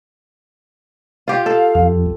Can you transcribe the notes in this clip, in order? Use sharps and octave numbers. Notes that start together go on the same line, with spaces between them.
F4 G4 F5
A4
F2